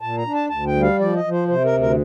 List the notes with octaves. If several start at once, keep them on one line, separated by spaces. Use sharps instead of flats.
A#2 A5
A#5
D4
A5
D2 A5
G5
G3
F5
F3 D5
D#5
F3
C5
C3 C5
A#4
D2
A#4